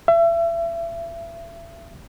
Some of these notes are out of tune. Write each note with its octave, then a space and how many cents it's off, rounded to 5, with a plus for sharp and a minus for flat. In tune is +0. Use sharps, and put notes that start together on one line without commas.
E5 +35